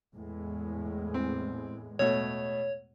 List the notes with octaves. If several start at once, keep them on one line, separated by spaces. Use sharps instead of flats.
E2 A2 G#3
C4
B2 A3 C#5